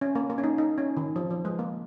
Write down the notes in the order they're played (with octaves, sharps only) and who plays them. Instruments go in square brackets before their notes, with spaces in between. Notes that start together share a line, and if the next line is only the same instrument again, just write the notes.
[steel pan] C#4
A#3
A#3
C#4
D#4
D#4
C#4
D#3
F3
F3
G#3
A#3